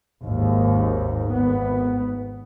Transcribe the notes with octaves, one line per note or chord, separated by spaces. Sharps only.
G#1 D#2 G#2
G#1 B3